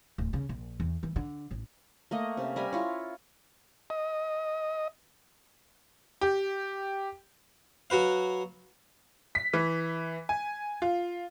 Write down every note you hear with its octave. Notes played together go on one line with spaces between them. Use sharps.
D1
C#3
A#1
E2
E3
D3
A1
A3 A#3 D#5
C3 C#4
G3 A#4 G#5 B5
E4 F4 C#5
D#5
G4
F#3 F#4 B4 F5
B6
E3
G#5
F4